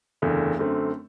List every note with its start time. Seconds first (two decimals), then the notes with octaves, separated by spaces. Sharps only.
0.22 F#1 E2 D3 A3
0.59 F#2 D3 A3 C4